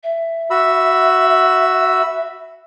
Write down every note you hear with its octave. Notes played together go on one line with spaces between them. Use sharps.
E5
F#4 B5 E6